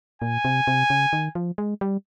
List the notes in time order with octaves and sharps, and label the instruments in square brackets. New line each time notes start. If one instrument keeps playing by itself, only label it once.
[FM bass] A#2 [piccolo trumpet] G#5
[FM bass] C3
C3
C#3
D#3
F3
G#3
G3